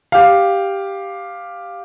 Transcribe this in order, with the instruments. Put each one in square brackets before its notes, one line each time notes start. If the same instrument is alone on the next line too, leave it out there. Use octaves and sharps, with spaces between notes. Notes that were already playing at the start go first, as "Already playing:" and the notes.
[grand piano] G4 F5